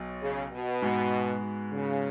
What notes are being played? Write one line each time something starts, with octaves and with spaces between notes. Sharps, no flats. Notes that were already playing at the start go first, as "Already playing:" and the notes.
Already playing: B1 B2 F#3
C#3
B2
G#2 G#3 B3 F#4
C#3